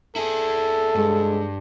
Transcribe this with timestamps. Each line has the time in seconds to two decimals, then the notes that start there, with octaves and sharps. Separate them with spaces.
0.16 E4 G#4 A4
0.95 G2 G#3